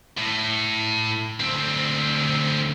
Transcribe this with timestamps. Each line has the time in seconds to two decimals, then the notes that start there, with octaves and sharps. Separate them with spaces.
0.18 A2
1.40 D2 C4